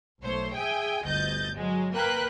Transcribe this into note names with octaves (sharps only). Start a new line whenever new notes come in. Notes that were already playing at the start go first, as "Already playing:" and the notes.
B1 A3 C5 C#5
G#4 E5 G5 G#5
G1 D2 D#5 G6 A6
F#3 G#3
A#3 A#4 B4 G5 F#6 B6